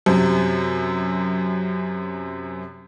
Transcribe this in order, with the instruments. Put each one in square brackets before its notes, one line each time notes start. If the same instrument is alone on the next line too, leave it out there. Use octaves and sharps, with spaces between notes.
[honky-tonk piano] F#2 C3